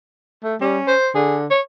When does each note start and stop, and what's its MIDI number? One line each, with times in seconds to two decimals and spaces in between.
0.44 0.56 57
0.61 0.78 55
0.61 0.94 61
0.87 1.10 72
1.15 1.47 50
1.15 1.37 68
1.50 1.60 73